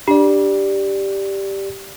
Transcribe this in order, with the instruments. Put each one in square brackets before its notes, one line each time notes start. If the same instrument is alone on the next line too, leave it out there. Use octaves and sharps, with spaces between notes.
[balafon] D4 [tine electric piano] G4 D5